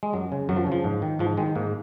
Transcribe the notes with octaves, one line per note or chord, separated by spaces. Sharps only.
G#3
F#2 F#3
C#3
F#2 F#3
F3
C#3 F3
G#2
D#3
G#2 F3
D#3 G#3
G#2 A#3